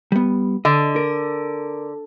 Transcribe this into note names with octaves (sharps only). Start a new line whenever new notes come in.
G3 B3
D3 D#5
A#4